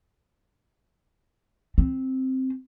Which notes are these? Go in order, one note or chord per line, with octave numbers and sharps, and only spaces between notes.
C4